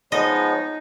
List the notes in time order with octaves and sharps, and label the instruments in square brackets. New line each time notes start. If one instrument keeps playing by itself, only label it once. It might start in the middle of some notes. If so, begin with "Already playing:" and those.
[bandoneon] F3 G#3 B3 [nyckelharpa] D#4 [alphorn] C#5 [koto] D#5